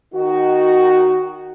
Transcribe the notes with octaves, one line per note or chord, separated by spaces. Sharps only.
D#3 D#4 F#4